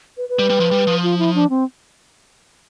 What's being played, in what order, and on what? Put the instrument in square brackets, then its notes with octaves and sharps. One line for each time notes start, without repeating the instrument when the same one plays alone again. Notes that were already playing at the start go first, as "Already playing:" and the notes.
[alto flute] B4
B4
[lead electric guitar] G3
G3
F3
G3
F3
[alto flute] F4
E4
D4
C4